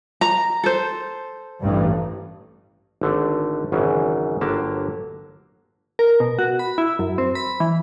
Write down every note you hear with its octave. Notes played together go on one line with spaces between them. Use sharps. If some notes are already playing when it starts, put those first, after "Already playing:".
A#5
A4 C5
A1 G2
G#1 D3 A3
G#1 F#2 C#3 E3
G1 D3 F#3 A#3 G4 A5
A#4
B2
F#4
B5
E4
F#2
C4
B5
E3